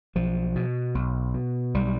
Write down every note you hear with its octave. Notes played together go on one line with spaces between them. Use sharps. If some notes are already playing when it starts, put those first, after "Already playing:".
B1 F3
B2
B1
B2
B1 G3